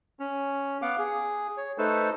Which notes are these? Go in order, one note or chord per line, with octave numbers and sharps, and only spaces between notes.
C#4
B3 F5 F#5 D6
G#4
C#5
A3 D#4 A4 B4 C5